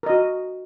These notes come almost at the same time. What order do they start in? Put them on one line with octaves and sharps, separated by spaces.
A#4 D#5 F#4